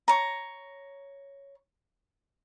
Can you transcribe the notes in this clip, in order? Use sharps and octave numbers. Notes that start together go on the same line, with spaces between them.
C#5 A#5